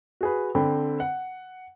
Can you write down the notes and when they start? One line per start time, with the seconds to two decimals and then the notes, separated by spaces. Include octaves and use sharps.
0.21 F#4 G#4 B4
0.55 D3 C4 C5 G5 B5
1.00 F#5